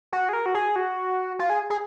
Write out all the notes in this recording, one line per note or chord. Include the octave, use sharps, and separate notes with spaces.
F#4
G#4
A#4
F#4
G#4
F#4
F4
G#4
G#4